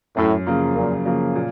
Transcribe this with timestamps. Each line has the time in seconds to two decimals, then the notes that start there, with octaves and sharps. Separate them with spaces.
0.17 F#2 A2
0.46 C#3 F3 A#3
0.76 F#2 A#2
1.05 C#3 F3 A#3
1.35 A#2